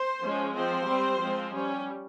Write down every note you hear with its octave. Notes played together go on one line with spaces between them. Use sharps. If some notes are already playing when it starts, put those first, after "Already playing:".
Already playing: C5
F3 G#3 C#4
F3 C4 C5
G3 C4
F3 G#3 C4
G3 C#4